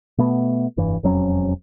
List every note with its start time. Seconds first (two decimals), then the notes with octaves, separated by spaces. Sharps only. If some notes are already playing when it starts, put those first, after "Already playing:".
0.18 B2 A3 B3
0.77 F1 G2 E3
1.03 E1 F2 F#3 C#4